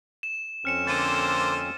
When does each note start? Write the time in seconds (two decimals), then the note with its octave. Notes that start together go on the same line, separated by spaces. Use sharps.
0.23 E7
0.65 F2 C4 C#4 F6 C#7 E7
0.87 D3 A#3 C5 A6 D#7